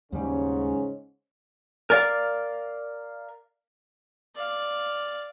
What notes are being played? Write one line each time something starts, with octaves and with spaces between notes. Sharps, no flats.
D#2 G#2 C#3 G3 G#3 C#4
A#4 D5 F5
D5 F5